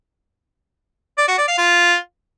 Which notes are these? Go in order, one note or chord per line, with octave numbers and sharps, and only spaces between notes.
D5
F#4
D5
F5
F4